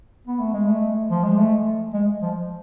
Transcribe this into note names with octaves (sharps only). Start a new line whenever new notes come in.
B3
A3
G#3
A3
F3
G#3
A3
G#3
F3